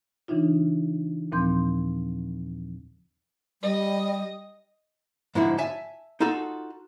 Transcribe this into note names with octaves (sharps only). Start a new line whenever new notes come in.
C#3 E3 D4 D#4 F4
D#2 A#2 F3 C4 C6 G6
G3 D#5
G#2 D3 F3 E4 F#4
E5 G#5 A5
D#4 F4 F#4 A4